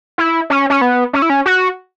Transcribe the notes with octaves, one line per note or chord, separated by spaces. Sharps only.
E4
C#4
C#4
B3
C#4
E4
C#4
F#4